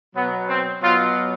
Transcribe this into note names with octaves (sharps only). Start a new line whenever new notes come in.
B2 F#3 B3
C4
B2 F#3 F4